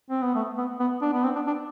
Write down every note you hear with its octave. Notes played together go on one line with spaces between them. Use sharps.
C4
B3
A3
B3
B3
D4
B3
C4
D4
D4